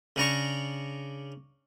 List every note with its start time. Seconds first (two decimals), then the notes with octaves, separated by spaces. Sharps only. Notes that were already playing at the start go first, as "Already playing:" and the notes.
0.16 C#3 D4 A#5 C#6